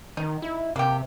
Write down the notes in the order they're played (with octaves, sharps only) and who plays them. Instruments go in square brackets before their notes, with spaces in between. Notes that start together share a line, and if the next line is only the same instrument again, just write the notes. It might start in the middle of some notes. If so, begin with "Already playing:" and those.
[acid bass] D#3 [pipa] D#4
[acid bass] E4
[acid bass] C3 [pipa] A#3 G4